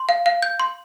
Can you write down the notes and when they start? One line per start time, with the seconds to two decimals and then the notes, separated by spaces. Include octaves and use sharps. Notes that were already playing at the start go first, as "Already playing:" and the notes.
Already playing: C6
0.09 F5
0.26 F5
0.42 G6
0.60 C6